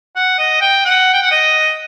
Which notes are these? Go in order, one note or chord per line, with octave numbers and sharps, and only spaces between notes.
F#5
D#5
G5
F#5
G5
F#5
D#5